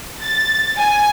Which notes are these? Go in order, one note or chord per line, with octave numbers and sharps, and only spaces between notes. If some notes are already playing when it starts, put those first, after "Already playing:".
A6
G#5